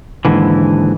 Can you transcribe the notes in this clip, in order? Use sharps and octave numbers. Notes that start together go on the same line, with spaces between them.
D#2 G#2 D3 E3